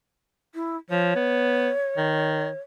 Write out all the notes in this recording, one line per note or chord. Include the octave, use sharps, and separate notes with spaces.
E4
F3 C#5
B3
D#3